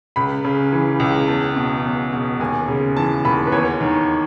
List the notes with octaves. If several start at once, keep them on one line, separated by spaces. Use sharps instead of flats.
C#2 B5
C#3
E3
C#2
E2 A5
B2
E2
B2
D#2 G#5
C#3
E3 A5
D#2 B5
B4
E2 C#5
D#3